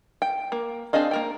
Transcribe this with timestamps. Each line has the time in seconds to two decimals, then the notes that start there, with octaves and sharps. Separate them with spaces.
0.22 G5
0.52 A#3
0.93 C4 D4 G#4 D#5 F5
1.11 A#3 A#4 G5